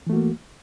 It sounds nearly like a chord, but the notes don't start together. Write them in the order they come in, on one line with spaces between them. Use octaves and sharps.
E3 A3 F#4 A#3